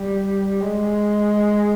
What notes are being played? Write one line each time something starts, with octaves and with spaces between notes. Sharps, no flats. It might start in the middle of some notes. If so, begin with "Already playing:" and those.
Already playing: G3
G#3